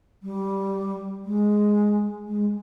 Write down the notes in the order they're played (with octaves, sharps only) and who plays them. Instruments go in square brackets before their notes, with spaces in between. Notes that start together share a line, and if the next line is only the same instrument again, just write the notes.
[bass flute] G3
G#3
G#3